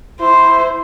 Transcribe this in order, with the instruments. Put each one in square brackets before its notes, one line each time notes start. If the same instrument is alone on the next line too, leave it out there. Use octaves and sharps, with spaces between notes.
[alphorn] E4 [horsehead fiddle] C5 [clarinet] C6